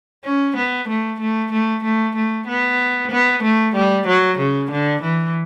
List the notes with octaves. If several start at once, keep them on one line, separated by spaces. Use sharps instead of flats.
C#4
B3
A3
A3
A3
A3
A3
B3
B3
A3
G3
F#3
C#3
D3
E3